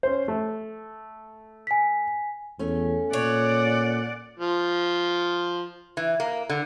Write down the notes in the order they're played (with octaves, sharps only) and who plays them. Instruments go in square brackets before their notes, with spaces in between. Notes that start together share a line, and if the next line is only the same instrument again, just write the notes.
[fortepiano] C#4 C5
A3
[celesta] G#5 B6
[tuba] E2 [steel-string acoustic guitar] A3 C#4
[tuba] A#2 [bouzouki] C#5 [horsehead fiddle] D5 F#5
[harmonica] F3
[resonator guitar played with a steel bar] E3
A#3
D3